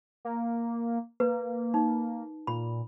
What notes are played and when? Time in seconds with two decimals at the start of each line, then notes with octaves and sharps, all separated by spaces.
0.25 A#3
1.20 A#3 B4
1.74 D#4
2.47 A#2 B5